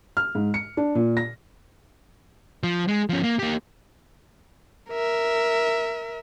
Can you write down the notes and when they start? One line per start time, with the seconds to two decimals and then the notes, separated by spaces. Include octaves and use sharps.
0.17 F6
0.35 G#2
0.54 C#7
0.77 D4
0.95 A#2
1.17 A#6
2.63 F3
2.88 G#3
3.09 F3 C#4
3.23 A#3
3.39 A#3 G4
4.90 A#4 E5